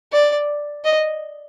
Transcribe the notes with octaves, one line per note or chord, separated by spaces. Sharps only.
D5
D#5